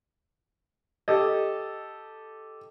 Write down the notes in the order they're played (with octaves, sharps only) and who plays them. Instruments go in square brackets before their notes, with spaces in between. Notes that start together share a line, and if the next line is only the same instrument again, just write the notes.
[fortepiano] G4 A4 D#5